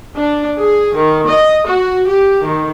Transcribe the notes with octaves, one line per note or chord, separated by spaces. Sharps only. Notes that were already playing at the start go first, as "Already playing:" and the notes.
D4
G#4
D#3
D#5
F#4
G4
D#3